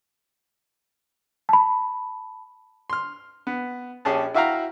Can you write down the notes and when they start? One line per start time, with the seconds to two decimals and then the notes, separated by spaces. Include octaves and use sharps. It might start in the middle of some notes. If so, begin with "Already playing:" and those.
1.49 A5 B5
2.90 C6 F6
3.47 B3
4.05 A#1 C#4 G4 G#4 A5
4.34 E4 F#4 E5 F5 G5 A#5